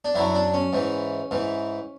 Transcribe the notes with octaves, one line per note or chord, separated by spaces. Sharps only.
D4
F#2 D3 F#3 E4
D4
C#4
G#2 E3
G#2 E3